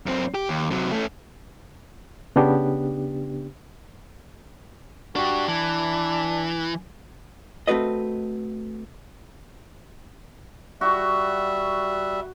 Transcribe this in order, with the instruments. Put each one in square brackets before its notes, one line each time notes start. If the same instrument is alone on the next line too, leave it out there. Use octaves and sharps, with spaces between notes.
[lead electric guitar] F#2 C4
G4
D#2
C3 F#3
A3 C#4
[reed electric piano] C#3 B3 D4 G4
[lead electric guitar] D4 G4 [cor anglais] F#4
[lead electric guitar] E3 [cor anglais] D4
[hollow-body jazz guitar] A3 C4 F#4 B4 D#5
[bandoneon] G3 E5 [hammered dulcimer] F#4